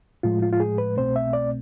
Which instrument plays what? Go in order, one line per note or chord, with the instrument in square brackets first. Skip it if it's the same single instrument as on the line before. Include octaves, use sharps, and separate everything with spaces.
[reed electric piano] A2 F3 G#3 F4
F4
F4
G#4
B4
C2 B2 A3 C4 C5
E5
D5